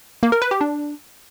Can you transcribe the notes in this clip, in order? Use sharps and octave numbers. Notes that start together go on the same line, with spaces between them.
A#3
A#4
B4
G4
D4